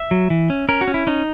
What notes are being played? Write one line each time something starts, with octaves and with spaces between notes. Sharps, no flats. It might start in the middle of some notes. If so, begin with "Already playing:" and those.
Already playing: E5
F#3
E3
C#4
C#4 A#4
F#4
C#4
E4
C#4 D#4